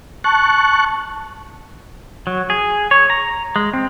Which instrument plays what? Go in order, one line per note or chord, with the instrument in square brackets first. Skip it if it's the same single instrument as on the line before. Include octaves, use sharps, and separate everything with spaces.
[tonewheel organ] A5 C#6 F#6
[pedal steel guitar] F#3
G#4
C#5
A#5
G#3
C4